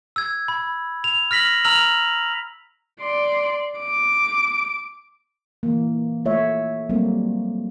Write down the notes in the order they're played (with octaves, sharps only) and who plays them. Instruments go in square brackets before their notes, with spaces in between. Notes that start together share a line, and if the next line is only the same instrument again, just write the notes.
[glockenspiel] E6 G#6
B5
F7
F6 A#6 B6 F#7
A#5 E6 F6 F7 F#7
[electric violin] D5 C6
D6
[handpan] E3 A#3
A3 F4 C#5 E5
F#3 G3 A3 A#3 C4